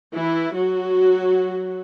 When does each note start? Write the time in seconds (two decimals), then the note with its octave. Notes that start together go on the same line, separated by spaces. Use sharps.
0.14 E3 E4
0.54 F#3 F#4